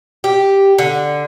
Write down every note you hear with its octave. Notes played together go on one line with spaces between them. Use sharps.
G4
D3